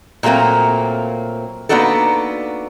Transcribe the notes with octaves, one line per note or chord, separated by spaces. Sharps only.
A#2 F#3 A3 A#3 C4
A#3 B3 D4 D#4 F#4 A4